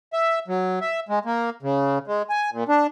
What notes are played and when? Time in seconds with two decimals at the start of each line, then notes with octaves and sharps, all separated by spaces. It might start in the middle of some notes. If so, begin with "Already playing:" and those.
0.13 E5
0.48 F#3
0.81 E5
1.09 G#3
1.25 A#3
1.63 C#3
2.07 G#3
2.30 G#5
2.52 A#2
2.68 D4